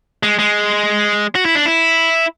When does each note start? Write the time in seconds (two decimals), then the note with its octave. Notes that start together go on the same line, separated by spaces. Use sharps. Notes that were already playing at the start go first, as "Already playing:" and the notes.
0.23 G#3
0.39 G#3
1.35 F#4
1.45 E4
1.55 D4
1.66 E4